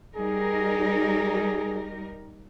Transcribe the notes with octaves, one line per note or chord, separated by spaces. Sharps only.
G3 D#4 G#4 A#4